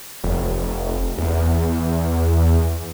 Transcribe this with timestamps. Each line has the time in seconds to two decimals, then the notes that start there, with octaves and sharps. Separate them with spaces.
0.24 F1
1.18 E2